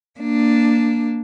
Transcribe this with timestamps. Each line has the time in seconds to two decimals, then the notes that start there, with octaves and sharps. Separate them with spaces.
0.20 A#3 D4